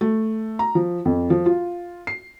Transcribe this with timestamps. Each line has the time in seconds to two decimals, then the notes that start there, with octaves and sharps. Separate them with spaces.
0.01 A3
0.59 A#5
0.75 F3
1.05 F2
1.30 F3
1.46 F4
2.07 C7